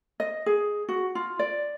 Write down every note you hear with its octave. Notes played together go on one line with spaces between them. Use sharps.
D#5
G#4
F#4
F4
D5